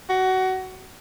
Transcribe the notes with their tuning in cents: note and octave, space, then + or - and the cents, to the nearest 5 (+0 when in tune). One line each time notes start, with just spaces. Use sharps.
F#4 +20